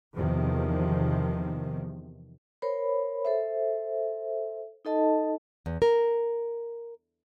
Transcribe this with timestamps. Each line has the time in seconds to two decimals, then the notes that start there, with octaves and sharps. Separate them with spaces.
0.16 E2 C3 D#3 F3
2.62 A#4 C5 C#5 B5
3.25 A4 C5 E5
4.85 D#4 A4 D#5 A5
5.66 E2
5.82 A#4